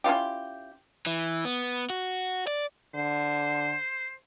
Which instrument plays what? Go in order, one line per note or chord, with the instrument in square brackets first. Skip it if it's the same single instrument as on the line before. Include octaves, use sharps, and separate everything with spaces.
[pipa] C#4 E4 F4 G4
[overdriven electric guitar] E3
B3
F#4
D5
[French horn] D3 [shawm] C5